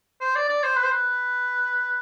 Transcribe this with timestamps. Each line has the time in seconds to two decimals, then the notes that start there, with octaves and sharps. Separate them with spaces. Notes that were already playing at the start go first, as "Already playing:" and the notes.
0.21 C5
0.35 D5
0.49 D5
0.63 C5
0.77 B4
0.84 C5
0.92 B4